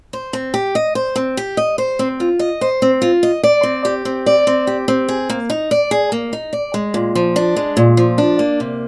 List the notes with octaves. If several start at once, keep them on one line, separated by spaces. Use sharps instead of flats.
C5
C4
G4
D#5
C5
C4
G4
D#5
C5
C4
F4
D#5
C5
C4
F4
D#5
D5
C4
G4
C4
D5
C4
G4
C4
G#4
A#3
D#4
D5
G#4
A#3
D#4
D5
G#3
A#2
F3
D4
G#3
A#2
F3
D4
A#3
C3